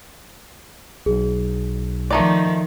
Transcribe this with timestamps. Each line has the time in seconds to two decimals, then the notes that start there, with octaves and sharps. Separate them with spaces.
1.06 B1 G#4
2.11 D#3 F3 A3 D#4 D5